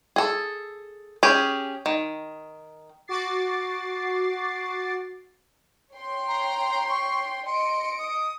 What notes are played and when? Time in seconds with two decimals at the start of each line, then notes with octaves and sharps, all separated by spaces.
0.16 G#4 A4
1.23 C#4 G4 G#4
1.86 D#3
3.08 F#4 D6 A6 C7
5.94 C#5 G5 C6
6.28 A#5
6.89 C#6
7.46 D#5 C6 C#7 D7
7.99 D#6